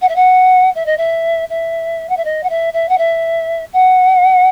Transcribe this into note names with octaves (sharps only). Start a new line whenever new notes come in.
F#5
E5
F#5
E5
D#5
E5
E5
F#5
E5
D#5
F#5
E5
E5
F#5
E5
F#5